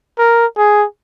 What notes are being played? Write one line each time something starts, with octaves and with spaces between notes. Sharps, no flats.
A#4
G#4